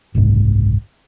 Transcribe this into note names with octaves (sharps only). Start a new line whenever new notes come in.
F#1 C2 G#2